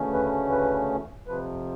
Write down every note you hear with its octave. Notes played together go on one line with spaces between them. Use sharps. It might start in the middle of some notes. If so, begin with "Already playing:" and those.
Already playing: D2 C#3 E3 A3 C#4
B4
B4
F2 C3 F3 B4